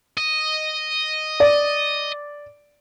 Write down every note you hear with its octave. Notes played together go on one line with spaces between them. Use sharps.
D#5
D5